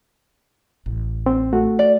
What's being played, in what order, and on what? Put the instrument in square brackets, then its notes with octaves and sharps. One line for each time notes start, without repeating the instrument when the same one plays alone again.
[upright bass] A1
[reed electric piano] C4
A3 F#4
[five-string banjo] D5